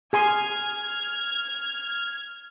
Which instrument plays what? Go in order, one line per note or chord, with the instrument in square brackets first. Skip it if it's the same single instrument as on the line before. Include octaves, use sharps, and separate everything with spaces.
[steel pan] G#4 G#5 C6 [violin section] F6 G#6